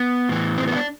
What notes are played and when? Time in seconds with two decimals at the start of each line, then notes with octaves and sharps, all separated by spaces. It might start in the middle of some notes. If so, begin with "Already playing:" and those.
Already playing: B3
0.29 A2 E3
0.57 C4
0.67 B3
0.72 E4
0.76 D4